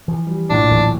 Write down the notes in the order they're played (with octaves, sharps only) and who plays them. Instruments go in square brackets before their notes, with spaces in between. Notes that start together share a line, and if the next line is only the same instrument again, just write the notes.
[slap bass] E3 F3
[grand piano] G3
[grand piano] A#1 A2 [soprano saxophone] D4
[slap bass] D1 E3 F#3